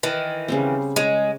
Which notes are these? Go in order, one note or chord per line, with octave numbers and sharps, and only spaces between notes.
D#3 E3
C#3 G3 C4
G#3 C#5